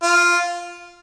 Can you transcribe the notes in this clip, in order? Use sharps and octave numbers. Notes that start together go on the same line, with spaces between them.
F4